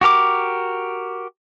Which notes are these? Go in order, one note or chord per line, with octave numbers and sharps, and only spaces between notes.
F#4 G4 A#4 D6